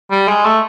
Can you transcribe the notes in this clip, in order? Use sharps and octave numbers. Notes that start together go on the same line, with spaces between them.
G3
G#3
A3